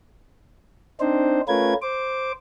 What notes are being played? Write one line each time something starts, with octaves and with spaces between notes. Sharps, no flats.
C4 D4 D#4 C5
A3 C#4 F4 A#4 B4 G#6
C5 D6